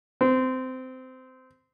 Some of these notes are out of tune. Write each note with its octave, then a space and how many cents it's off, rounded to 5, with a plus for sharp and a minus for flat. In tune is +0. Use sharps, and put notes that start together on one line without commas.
C4 -20